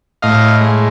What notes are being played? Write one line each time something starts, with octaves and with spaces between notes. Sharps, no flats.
A2 D#5 F5
G#3